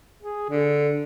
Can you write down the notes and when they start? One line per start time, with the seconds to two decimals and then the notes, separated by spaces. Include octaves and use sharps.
0.22 G#4
0.49 D3